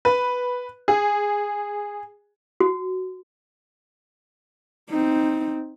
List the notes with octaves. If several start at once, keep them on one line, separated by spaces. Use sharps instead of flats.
B4
G#4
F#4
C4 D#4